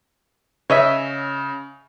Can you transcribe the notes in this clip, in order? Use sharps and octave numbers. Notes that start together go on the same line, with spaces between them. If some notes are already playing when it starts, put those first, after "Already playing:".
C#3 C#5 D#5 E5